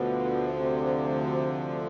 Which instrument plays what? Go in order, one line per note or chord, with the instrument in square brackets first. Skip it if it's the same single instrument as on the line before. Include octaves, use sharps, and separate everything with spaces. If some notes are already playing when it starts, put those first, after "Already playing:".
Already playing: [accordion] D2 D3 F3 [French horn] B2
[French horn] C3